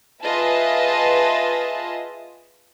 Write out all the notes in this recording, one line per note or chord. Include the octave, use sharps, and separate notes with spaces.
F4 G#4 B4 D#5 E5 A5